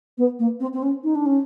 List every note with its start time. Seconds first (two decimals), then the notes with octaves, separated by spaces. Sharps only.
0.18 B3
0.39 A#3
0.60 C4
0.73 C4
0.82 C#4
1.04 D#4
1.15 D4
1.26 C#4